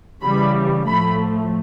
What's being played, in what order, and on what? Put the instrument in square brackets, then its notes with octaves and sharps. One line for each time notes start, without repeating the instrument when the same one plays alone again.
[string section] C#3 E3 G3 B5
A2 F3 A3 B5